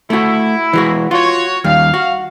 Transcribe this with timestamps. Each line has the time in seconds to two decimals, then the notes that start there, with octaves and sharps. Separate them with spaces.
0.10 A3 E4 F#4
0.73 E3 G#3 F#4
1.11 F4 F#4 C#5
1.64 D#2 G3 F5
1.94 F#4